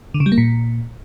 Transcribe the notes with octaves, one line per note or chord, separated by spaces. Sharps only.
D3
C#3
G3
A#3
A#2